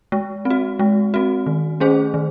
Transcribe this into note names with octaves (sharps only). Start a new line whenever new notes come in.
G#3
C4
F#4
G#3
C4 F#4
D#3
A3 C#4 G#4 C5
D#3